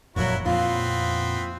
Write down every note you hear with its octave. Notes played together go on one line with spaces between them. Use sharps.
F#1 F2 A#2 F3 F#3 E4 F#4 C#5
F2 A#2 B3 C4 E4 F4